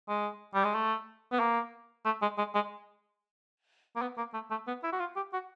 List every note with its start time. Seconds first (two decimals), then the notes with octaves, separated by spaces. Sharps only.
0.09 G#3
0.55 G3
0.64 G#3
0.75 A3
1.32 B3
1.40 A#3
2.06 A3
2.22 G#3
2.38 G#3
2.55 G#3
3.96 A#3
4.02 B3
4.18 A#3
4.34 A3
4.50 A3
4.67 B3
4.84 E4
4.93 F#4
5.00 F4
5.16 G4
5.33 F#4